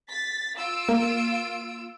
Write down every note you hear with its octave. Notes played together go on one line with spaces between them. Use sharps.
A6 B6
F4 E6 D7
A#3